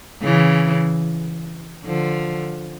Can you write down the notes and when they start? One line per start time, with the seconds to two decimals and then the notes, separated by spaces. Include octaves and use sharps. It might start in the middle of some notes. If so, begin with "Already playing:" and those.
0.22 C#3 E3
1.85 D3 F3